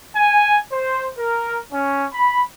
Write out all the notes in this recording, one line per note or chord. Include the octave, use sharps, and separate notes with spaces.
G#5
C5
A#4
C#4
B5